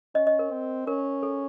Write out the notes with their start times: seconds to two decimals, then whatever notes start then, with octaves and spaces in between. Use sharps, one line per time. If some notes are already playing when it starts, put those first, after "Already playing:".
0.15 C#4 D#5
0.27 D#5
0.39 A#4
0.51 C4
0.87 C#4 A#4
1.23 A4